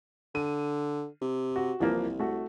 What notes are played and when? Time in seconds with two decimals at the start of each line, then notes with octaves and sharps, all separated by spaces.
0.35 D3 D#7
1.22 C3
1.56 F#4
1.80 C2 E3 F3 A#3
2.20 A3 F#4